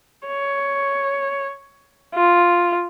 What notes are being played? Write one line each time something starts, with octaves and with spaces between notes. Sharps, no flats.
C#5
F4